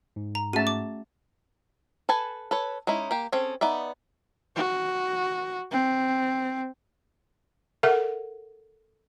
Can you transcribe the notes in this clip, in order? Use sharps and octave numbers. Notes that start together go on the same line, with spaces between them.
G#2
A#5
A3 C#4 F#4 G#4 E5 A5 D#7
D6
A4 B4 G#5 A5
A4 B4 C#5
G#3 C#4 D#4 E4
A#3 G4
C4 C#4 G#4 A4
B3 D#4 D5 E5
F#4
C4
A4 A#4 E5 F#5